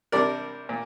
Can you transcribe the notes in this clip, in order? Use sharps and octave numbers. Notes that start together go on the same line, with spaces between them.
C3 G3 D4 A#4 D5
A#2